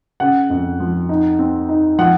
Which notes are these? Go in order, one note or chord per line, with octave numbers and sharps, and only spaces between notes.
C#3 F#5
F2
F3
D#4
C4
D#4
F3 F#5